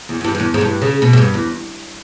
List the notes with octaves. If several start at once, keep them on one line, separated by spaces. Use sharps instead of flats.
E2
E2
G2
G2
E2
G#2
G2
C#3
B2
G#2
G2
E2